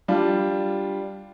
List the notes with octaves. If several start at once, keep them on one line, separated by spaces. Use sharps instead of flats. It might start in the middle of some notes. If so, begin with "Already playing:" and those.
G3 D4 F4